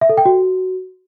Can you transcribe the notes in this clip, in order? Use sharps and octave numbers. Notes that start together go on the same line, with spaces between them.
E5
A4
G5
F#4